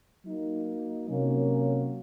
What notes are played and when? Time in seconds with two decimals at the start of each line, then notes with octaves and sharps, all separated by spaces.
0.25 F#3 A#3 D#4
1.08 C3 F#3 A#3 C#4